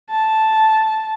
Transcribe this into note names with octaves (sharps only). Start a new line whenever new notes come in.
A5